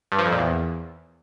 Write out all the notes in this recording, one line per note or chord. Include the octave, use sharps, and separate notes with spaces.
G2
F3
F2
A#2
E2